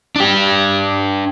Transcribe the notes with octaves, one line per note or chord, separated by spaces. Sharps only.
D4 G4